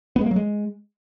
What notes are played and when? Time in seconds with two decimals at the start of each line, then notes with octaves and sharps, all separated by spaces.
0.16 B3
0.21 G#3
0.26 A#3
0.31 F#3
0.36 G#3